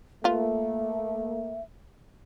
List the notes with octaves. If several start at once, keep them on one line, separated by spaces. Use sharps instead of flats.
A3 A#3 F4 B4 E5